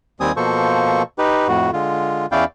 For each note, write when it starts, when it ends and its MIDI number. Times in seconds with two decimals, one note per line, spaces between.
0.20 0.32 39
0.20 0.32 55
0.20 0.32 60
0.20 0.32 80
0.20 0.32 87
0.37 1.03 47
0.37 1.03 53
0.37 1.03 58
0.37 1.03 69
0.37 1.03 72
0.37 1.03 85
1.18 1.47 63
1.18 1.47 67
1.18 1.47 71
1.48 1.71 41
1.48 1.71 45
1.48 1.71 66
1.73 2.26 50
1.73 2.26 56
1.73 2.26 65
2.32 2.44 40
2.32 2.44 61
2.32 2.44 64
2.32 2.44 74
2.32 2.44 77
2.32 2.44 79